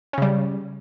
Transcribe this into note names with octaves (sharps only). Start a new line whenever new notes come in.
C#3 G3 C#4